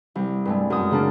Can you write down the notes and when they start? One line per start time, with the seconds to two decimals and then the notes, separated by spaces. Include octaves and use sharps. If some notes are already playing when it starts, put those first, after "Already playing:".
0.15 C2
0.45 G2 G#3 A3
0.70 F#2 D#6
0.91 C#3 A#3 D4